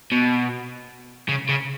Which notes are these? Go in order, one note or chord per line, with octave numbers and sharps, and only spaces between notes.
B2
C#3
C#3